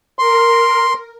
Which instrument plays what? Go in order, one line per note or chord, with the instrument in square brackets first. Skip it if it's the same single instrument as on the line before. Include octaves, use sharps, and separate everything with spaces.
[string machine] A#4 [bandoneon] C6